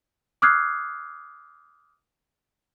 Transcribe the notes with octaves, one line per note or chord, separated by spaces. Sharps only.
D6 D#6 F6 F#6 G#6 C7